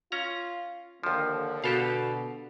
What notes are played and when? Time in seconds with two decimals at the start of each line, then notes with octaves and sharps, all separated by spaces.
0.12 C#4 F4 A#5
1.03 D#2 D3 F3
1.64 B2 G4 A4 F5